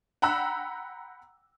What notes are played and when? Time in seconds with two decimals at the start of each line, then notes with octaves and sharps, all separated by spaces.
0.22 F#5 G5 A#5 B5 E6 F#6